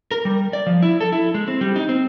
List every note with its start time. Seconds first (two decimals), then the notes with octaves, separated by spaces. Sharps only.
0.11 A#4
0.25 G3
0.53 D5
0.67 F3
0.82 E4
1.01 A4
1.12 E4
1.34 G#3
1.48 C4
1.61 G3
1.76 D#4
1.89 C4